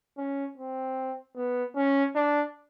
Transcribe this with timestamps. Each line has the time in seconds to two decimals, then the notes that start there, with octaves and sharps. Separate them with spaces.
0.18 C#4
0.58 C4
1.36 B3
1.76 C#4
2.15 D4